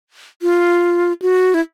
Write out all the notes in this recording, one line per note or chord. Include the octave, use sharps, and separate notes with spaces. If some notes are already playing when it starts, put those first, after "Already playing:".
F4
F#4
E4